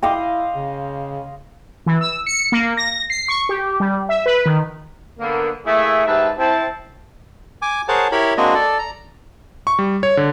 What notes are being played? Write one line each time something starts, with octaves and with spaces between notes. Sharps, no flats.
E4 D#5 F5 G5 C6 D6
C#3
E3
E6
C#7
A#3
A#6
C7
C#6
G4
G3
E5
B4
D#3
D3 A#3 B3
A3 A#3 E4 G#4 C#5 E5
G#2 G4 B4 E5 A5
C4 E4 A5
G#5 D6
G#4 A#4 C5 C#5 F#5 A5
E4 G4 A#4 C#5 B5
G#3 A#3 C4 D4 F#4 D#5
A4 D5
A#5
C#6
G3
C#5
D3